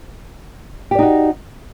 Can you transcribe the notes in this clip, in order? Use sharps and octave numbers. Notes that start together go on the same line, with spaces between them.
D#4 F#4 G4 D5